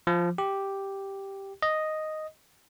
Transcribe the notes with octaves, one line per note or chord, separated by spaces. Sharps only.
F3
G4
D#5